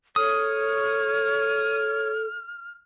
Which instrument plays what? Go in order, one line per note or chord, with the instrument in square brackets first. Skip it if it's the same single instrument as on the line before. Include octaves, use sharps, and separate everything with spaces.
[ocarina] A4 [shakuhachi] C#5 [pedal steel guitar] D#6 [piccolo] F6